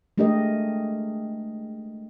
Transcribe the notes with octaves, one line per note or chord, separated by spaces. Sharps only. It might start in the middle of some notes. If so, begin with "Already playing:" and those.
G#3 A3 D4 G4 A#4 D#5